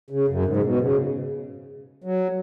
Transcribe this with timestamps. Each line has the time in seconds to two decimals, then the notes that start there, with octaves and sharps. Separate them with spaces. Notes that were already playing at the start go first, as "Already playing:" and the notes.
0.10 C#3
0.28 F#2
0.45 G#2
0.56 C#3
0.63 B2
0.81 C#3
2.04 F#3